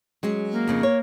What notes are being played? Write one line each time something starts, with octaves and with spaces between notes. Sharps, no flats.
F#3 G#3 C#4
A#3
F2 C#3 D#4
C#5